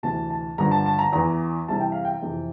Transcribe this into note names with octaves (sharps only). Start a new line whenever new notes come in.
D2 C3 E3 A5
A5
G2 D3 F3 A#5
A5
A5
A#5
E2 E3 A#5
C2 C3 E3 A5
G5
F5
G5
F2 C3 E3